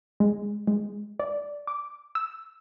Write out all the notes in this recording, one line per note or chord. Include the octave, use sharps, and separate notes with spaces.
G#3
G#3
D5
D6
E6